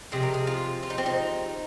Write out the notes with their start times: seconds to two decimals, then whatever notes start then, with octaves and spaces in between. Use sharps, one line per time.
0.12 C3 F3 G#3 G#4
0.23 A#4
0.34 G#4
0.47 F4
0.83 F4
0.90 D#4
0.98 C4
1.06 D#4